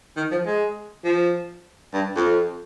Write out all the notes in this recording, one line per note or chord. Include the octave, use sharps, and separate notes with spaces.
D#3
F3
G#3
F3
G2
F2